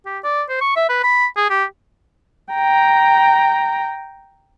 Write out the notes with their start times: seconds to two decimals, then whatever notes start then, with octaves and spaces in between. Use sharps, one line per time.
0.06 G4
0.24 D5
0.49 C5
0.61 C#6
0.76 E5
0.89 B4
1.04 B5
1.37 G#4
1.50 G4
2.53 G5 A#5